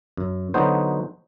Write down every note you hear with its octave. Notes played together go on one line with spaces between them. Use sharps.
F#2
D3 F#3 B3 D#4 F#4 C5